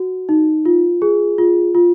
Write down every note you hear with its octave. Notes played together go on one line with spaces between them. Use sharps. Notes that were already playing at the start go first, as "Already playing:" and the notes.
Already playing: F#4
D#4
F4
G#4
F4
F4